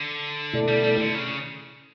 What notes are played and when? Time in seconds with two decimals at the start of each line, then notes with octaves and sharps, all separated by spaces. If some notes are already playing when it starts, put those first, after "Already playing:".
Already playing: D3
0.53 B2 A3 E4 A4 D5
0.68 G3
0.84 G3
1.00 D3
1.15 C#3